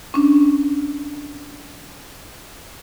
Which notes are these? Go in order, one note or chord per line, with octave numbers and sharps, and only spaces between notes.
C#4 D4